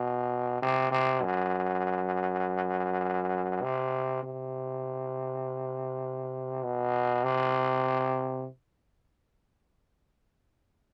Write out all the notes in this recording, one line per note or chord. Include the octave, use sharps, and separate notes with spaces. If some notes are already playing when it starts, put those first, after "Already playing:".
Already playing: B2
C3
C3
F#2
C3
C3
B2
C3